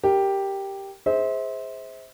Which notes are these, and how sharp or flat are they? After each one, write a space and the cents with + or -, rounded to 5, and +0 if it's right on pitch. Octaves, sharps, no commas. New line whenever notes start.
G4 +0 A#4 +0
G#4 +0 C5 +0 E5 -35